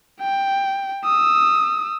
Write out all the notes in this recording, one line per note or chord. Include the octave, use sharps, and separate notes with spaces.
G5
D#6 E6